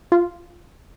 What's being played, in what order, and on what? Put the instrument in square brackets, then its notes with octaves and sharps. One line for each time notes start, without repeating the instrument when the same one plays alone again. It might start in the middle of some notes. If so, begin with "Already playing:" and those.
[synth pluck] F4